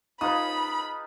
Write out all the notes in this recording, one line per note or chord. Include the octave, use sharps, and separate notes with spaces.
D#4 F4 G#4 B4 B5 D#6